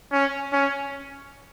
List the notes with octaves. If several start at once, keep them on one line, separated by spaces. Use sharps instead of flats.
C#4
C#4